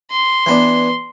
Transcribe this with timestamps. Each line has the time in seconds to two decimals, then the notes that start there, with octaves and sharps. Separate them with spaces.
0.11 C6
0.46 E3 B3 D4